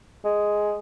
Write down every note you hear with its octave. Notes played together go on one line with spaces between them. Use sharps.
G#3